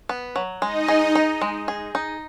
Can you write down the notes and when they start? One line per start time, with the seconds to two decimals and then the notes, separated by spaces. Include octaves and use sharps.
0.09 B3
0.36 F#3
0.62 G#3 D#4 D#5
0.88 G#4
1.15 D#4
1.41 G#3
1.68 G#4
1.95 D#4